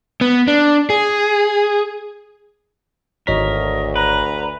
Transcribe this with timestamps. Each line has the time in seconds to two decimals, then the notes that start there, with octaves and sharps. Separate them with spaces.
0.21 B3
0.48 D4
0.90 G#4
3.27 G#1 D2 A#4 C#5 D#5 B6
3.96 B4 A#5